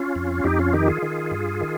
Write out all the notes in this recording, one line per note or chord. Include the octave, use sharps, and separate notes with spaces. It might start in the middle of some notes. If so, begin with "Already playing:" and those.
Already playing: C#4 F4
F2
F2 D#4 G4
C#4 F4
D#3 D#4 G4
F4 G#4
D#3
G2
D#3